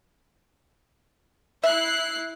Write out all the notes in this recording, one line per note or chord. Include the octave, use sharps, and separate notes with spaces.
E4 E5 F#6 C7